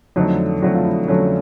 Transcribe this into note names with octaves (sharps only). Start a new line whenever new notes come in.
F2 D3 F#3 A3 D#4
F2 D3 F#3 A3 F#4
F4
E4
F2 D3 F#3 A3 C#4